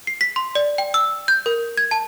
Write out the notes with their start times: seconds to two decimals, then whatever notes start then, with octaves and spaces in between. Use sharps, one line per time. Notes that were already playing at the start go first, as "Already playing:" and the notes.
0.07 C7
0.21 B6
0.36 C6
0.55 D5
0.78 G5
0.94 E6
1.28 G6
1.46 A#4
1.78 G#6
1.91 A5